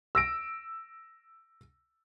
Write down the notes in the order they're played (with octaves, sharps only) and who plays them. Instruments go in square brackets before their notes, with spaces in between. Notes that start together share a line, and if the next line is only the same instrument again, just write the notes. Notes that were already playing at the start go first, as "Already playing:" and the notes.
[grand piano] E6 A#6 D7